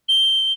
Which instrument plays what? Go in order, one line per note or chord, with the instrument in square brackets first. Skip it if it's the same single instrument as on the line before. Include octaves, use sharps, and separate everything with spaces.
[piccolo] G7